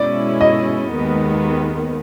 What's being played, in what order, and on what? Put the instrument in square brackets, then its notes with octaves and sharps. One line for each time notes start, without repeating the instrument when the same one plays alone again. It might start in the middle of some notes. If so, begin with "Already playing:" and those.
Already playing: [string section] B2 G#3 C#4 E4 [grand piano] D5
[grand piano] D#5
[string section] D#2 D#3 G#3 B3